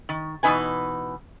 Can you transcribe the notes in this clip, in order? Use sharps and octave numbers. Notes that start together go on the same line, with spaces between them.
D#3
B2 E3 C#4 D#4 B4 G#5